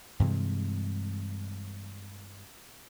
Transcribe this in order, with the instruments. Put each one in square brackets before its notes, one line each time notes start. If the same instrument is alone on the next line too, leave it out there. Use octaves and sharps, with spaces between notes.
[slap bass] G2 C3 E3 G#3